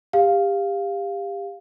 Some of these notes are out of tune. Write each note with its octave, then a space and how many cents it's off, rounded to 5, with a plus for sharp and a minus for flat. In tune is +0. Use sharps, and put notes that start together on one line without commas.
G4 +25 F5 +0